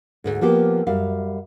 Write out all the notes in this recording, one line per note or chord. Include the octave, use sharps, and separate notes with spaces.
D2 G#2
F3 A#3 B3 G4
F#2 G3 E5 F5